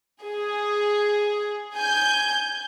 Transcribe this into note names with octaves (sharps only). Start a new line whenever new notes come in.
G#4
G#5 G6